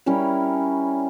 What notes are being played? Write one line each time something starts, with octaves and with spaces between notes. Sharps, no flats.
G3 C#4 E4 A#4